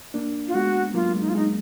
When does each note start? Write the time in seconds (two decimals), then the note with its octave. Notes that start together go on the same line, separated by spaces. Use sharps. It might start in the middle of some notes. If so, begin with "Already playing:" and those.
0.14 A#3 D4
0.48 F4
0.54 G#3 B3 F#4
0.94 F#3 A#3 F4
1.15 G#3
1.21 D#4
1.29 F4
1.35 G#3 D#4